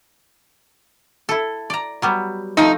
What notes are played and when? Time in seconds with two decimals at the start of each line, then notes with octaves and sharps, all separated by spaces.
1.29 E4 A4
1.70 D5 A#5
2.02 F#3 G3 B3
2.57 F3 A3 C4 D#4